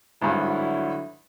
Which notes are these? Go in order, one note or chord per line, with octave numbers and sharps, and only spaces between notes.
G#1 G2 D3 F#3 E4